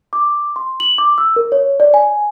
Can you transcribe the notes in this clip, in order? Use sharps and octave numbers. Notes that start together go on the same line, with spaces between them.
D6
C6
F#7
D6
E6
A#4
C#5
D5
G#5